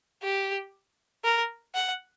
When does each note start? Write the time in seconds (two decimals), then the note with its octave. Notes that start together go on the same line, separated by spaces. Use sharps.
0.23 G4
1.24 A#4
1.74 F#5